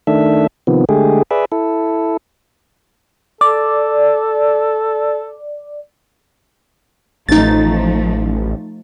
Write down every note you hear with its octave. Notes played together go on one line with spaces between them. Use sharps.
D#3 A3 D4 E5
C3 D#3 F3 B3
D3 G#3 A3 G4 G#4
G#4 B4 D5 E5
E4 A4
A4 D5
A1 F3 A3 D#4 A6